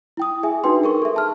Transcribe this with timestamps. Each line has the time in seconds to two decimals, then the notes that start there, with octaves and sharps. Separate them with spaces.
0.17 E4 G5 D#6
0.43 G#4 E5 G#5
0.64 D4 D#4 F#4 B4 G5 C6
0.84 G#4 A#4 C#6
1.02 A4 E5
1.16 A5 F6